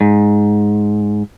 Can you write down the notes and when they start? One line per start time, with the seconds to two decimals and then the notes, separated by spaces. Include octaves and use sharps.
0.01 G#2